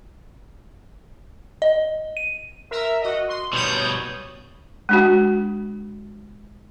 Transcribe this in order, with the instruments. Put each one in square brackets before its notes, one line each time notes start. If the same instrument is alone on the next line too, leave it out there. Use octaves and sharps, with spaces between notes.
[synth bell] D#5
D#7
[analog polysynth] A#4 E5
F#4 D#5
C6
[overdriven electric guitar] B2 G3 [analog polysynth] C#5 D#6 G6
[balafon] G#3 D4 F#4